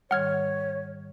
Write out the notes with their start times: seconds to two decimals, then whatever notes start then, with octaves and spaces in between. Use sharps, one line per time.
0.11 G#2 D#3 G3 C#5 F#5 F6 G#6